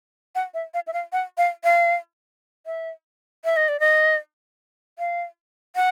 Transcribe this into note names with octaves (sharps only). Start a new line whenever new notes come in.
F#5
E5
F5
E5
F5
F#5
F5
F5
E5
E5
D#5
D5
D#5
F5
F#5